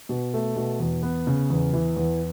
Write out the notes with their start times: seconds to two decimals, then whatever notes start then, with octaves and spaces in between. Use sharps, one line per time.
0.09 B2
0.34 A3
0.56 B2
0.80 E2
1.03 B3
1.27 C#3
1.50 E2
1.73 E3
1.97 E2